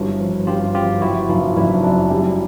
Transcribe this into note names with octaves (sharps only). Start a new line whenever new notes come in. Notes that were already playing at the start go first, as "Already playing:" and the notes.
Already playing: G1 G2 E4 F#4
F3
G2 F4 G4
F3 F4 G4
F#1 E4 F#4
F#1 D#4 F4
F#1 D4 E4
F#2 C4 D4
G3